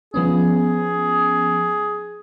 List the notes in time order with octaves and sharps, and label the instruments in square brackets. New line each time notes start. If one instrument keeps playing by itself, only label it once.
[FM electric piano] F3 B3 C#4 [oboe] G#4